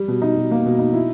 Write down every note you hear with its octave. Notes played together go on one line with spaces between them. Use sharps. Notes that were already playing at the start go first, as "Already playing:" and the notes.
Already playing: G3
B2
D#4
B2
A#3
B2
D#4
E4